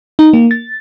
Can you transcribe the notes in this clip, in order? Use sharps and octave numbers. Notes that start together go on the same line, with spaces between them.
D#4
A#3
A6